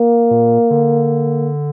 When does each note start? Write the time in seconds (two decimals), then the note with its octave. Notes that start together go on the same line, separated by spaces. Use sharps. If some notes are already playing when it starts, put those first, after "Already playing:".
Already playing: A#3
0.31 A#2
0.71 D3